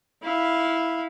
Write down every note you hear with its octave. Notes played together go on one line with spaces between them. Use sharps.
E4 F5